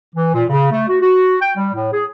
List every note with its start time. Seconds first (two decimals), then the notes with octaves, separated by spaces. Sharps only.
0.14 E3
0.33 A#2
0.49 C#3
0.70 A3
0.87 F#4
1.01 F#4
1.40 G5
1.56 G3
1.73 A2
1.92 G#4